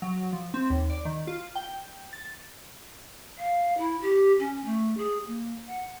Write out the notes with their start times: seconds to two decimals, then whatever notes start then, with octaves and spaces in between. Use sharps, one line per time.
0.02 F#3
0.33 F3
0.54 C4
0.70 D#2
0.90 D5
1.05 D#3
1.27 F4
1.55 G5
2.13 A6
3.38 F5
3.78 E4
4.01 G4
4.39 C#4
4.65 A3
4.97 G#4
5.27 A#3
5.67 F#5